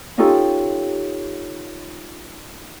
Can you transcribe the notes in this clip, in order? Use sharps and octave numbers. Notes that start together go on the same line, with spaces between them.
C#4 D#4 F4 G4 A4